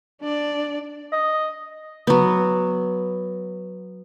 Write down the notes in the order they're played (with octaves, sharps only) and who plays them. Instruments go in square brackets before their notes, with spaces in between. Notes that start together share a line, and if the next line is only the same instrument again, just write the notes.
[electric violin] D4 D5
[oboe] D#5
[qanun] F#3 B3